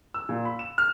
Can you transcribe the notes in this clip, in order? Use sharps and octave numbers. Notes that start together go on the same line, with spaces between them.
E6
A#2
B5
E7
F6